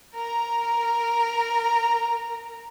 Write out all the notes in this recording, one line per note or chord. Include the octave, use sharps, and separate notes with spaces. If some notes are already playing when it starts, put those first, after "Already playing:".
A#4 A#5